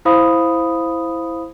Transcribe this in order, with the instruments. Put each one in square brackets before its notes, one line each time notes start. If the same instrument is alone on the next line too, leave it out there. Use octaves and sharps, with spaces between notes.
[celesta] E4 C5 F5 B5 D#6